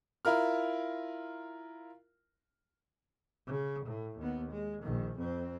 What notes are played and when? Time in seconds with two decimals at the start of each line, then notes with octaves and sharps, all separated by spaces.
0.25 E4 F4 A#4 F6
3.47 C#3
3.85 A2
4.19 D#2 B3
4.51 G#3
4.82 A#1 D#3
5.17 F2 C4